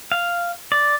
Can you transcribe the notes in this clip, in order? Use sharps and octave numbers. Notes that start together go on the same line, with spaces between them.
F5
D5